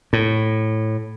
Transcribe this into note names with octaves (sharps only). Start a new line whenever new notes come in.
A2